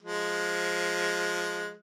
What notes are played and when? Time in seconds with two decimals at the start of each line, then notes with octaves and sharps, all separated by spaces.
0.02 F3 G#3